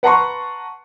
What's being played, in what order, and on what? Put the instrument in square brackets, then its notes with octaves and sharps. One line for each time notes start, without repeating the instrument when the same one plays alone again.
[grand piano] B4 F#5 A5 A#5 C6 C#6